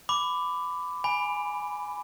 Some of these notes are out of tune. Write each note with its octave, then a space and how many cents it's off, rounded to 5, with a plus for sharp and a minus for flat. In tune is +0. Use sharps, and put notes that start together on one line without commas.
B5 +20 D6 +0
G#5 +0 B5 +0